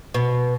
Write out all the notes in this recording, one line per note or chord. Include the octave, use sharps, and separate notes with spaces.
B2